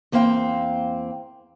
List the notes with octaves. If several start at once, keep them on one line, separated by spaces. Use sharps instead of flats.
E2 A#3 C4 F5 G5